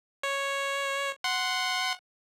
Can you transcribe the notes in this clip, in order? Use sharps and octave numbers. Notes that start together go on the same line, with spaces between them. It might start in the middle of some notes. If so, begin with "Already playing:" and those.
C#5
F#5 C6